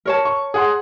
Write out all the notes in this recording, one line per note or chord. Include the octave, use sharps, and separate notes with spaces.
A#4 C#5 A5
C#6
G#4 F#5 C6